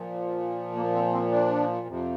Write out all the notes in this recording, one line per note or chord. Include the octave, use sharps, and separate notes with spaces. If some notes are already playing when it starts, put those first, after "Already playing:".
Already playing: A#2 F3
A#3
C4
C4
D4
F2 C3 F3